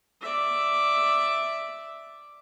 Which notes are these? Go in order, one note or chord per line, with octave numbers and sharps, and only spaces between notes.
D5 E5